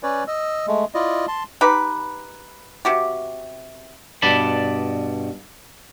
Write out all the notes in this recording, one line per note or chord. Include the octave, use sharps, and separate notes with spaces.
C#4 B4 C#5 D5
D#5 E6
G#3 A3
E4 F4 D5 D#5
A5 C6
D#4 G4 B4
C3 F#4 G4
G2 B2 D5 A5 B5